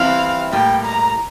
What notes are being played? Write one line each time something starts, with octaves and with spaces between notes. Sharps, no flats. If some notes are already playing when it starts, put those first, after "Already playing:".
Already playing: E3 G3 C4 E4 F5
A2 G3 A#3 G5
A#5